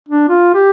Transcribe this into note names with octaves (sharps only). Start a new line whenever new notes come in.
D4
F4
G4